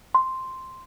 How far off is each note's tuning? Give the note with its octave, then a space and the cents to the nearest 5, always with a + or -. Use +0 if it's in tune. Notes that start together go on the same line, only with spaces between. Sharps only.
C6 +0